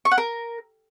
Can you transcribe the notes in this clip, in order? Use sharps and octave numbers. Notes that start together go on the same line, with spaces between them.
C#6
F#5
A#4